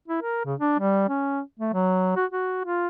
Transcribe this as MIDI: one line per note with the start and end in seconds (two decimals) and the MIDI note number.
0.08 0.22 64
0.22 0.42 70
0.45 0.54 49
0.60 0.77 62
0.79 1.07 55
1.09 1.40 61
1.60 1.73 57
1.73 2.14 54
2.16 2.25 66
2.31 2.61 66
2.64 2.88 65